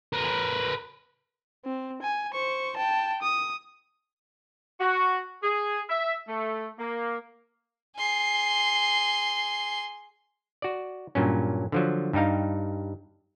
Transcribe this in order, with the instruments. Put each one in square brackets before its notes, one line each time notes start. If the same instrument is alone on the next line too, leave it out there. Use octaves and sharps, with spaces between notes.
[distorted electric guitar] A#4 B4
[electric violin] C4
G#5
C5 C#6
G5 A5
D#6
[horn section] F#4
G#4
E5
A3
A#3
[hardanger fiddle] G#4 C6
[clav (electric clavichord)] F#4 D5
G2 A#2 F#3 C#4
D3 F3 F#3
G2 G3 D#4 F5